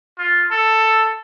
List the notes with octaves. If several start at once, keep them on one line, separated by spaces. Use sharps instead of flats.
F4
A4